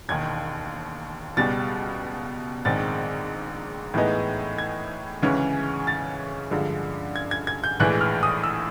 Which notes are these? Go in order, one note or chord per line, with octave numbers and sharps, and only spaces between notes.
E1 D#2 D#3 G#6
C#2 B2 G3 A6
A#1 G#2 D#3 G#3 C4 A6
A2 E3 G#3 B3 D#4
G#6
D2 C#3 E3 G#3 C#4
A6
G2 D3 F3 G#3
G#6
G#6
G#6
G6
A#1 A2 E3 G#3 F#6
F6
D#6
E6